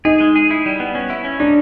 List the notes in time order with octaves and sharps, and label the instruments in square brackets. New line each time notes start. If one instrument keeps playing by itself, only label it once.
[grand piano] D#4 [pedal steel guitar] G#4
[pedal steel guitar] G#3
G#4
E4
G3
B3
C#4
E4
C#4
[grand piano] D4 [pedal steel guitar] D#4